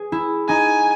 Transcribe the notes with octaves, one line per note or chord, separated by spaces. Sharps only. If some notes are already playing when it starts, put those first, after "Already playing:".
Already playing: G#4
E4
D#4 G#5